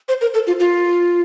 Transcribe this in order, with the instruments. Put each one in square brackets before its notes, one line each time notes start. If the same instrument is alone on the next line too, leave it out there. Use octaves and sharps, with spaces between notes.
[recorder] C5
A#4
A4
F4
F4